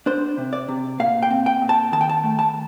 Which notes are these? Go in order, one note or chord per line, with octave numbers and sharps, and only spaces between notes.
D4 C5
C3
D5
C3
A#2 F5
G5
C4
G5
A#2
A5
D#3 A5
G5
A5
A3
A5